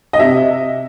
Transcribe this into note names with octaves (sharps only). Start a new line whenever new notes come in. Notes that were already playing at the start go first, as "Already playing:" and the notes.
D#5
C3 E5